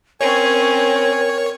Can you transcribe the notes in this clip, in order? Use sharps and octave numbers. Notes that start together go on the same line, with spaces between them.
C4 C#4 A#4 C#5 G#5